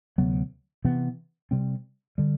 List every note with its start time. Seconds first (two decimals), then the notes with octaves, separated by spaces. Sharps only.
0.18 D2 C3 F#3 B3
0.85 C3 E3 B3
1.51 C3 G3 C4
2.18 D3 G3